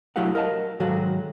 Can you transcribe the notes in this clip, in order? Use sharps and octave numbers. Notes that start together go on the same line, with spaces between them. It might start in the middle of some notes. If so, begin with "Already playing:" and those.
F#3 A3 E4 G4 F5 F#5
A#4 D#5 F5 A5
G#2 D#3 F#3 F#4 A4 F5